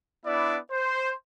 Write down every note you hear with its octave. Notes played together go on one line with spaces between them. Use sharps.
B3 D4 E4 D5
C5